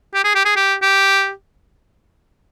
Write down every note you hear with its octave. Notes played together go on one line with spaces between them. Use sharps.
G4
G#4
G4
G#4
G4
G4